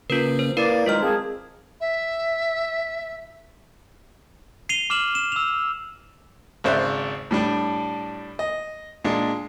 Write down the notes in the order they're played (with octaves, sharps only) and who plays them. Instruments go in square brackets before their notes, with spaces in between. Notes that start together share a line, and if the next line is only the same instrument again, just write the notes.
[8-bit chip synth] C#3 A#3 C#4 [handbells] F4 A#4 B4
[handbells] C5
[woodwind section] A#3 D5 [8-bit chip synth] E4 [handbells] A#4 B4
[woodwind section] D#3 F#3 G#3 [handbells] F4 C5 F6
[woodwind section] A#3 C4 G#4 [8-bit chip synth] A5
[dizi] E5
[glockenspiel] C7 D#7 F7 G7
D6 F6 E7 F#7
E7
E6 F7
[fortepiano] G#1 C#3 C5 D5 E5 F#6
A2 G3 D4
D#5
A#2 G#3 D4